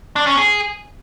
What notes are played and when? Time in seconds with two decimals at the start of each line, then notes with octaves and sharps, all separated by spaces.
0.16 D4
0.27 C#4
0.38 G#4